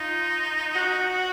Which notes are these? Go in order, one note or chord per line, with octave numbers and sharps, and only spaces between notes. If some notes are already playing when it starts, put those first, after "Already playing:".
Already playing: D#4 F4
F#4